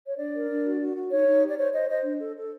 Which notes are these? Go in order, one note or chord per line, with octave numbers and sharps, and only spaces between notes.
C#5
D4 D5
A#4
D4
F#4
F#4
F#4
D#4 C#5
D#4
G4
D5
C5 C#5
C5 D#5
C5 D#5
D4
A4
A4